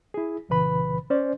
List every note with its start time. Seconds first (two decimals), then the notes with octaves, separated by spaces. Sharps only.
0.14 E4 G#4
0.49 C2 A#2 C#3 E3 B4 B5
1.10 C#4 C5 D5